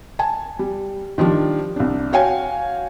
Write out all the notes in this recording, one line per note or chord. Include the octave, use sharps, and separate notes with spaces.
G#5 A5
G3
D#3 F3 G3 D4
C2 D4
F#4 C#5 F5 G5 G#5